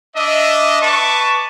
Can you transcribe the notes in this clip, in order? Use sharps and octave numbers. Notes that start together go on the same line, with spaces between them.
D4 D#5 E5
B4 A5 C#6 D6